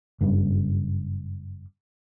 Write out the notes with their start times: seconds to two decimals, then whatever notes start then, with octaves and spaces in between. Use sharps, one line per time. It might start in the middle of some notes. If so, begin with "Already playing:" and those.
0.21 F#1 G2 C#3